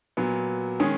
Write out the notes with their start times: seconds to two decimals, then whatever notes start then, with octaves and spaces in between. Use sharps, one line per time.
0.17 A#2 F#3 B3
0.80 D#3 G#3 C#4